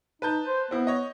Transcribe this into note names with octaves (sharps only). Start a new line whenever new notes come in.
D#4 B4 A5 G6
C5
B3 C4 E4
C#5 D#5